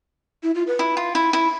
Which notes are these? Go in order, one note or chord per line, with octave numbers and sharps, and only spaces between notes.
E4
F4
B4
E4
F4
E4
E4